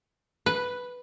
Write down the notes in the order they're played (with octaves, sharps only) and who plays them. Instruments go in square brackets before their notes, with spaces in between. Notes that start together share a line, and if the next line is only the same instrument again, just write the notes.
[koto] B4